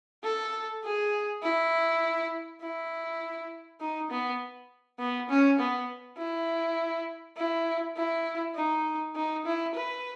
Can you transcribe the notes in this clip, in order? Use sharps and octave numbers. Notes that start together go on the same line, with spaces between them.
A4
G#4
E4
E4
D#4
B3
B3
C#4
B3
E4
E4
E4
D#4
D#4
E4
B4